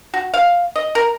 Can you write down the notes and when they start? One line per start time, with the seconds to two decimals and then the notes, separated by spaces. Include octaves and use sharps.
0.14 F#4
0.34 F5
0.76 D#5
0.95 A#4